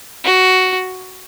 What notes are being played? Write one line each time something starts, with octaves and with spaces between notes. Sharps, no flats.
F#4